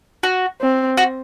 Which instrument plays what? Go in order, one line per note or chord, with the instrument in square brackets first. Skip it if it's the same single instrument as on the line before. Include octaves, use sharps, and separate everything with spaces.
[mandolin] F#4
[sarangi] C4
[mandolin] F#4